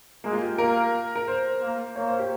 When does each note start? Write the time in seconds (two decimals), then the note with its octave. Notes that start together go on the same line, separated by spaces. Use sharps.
0.24 G#3 A#3
0.33 F4
0.41 G4
0.58 A#3 A#4
1.16 A#4
1.28 C5
1.62 A#3
1.96 A#3 C#5
2.08 C5
2.19 G4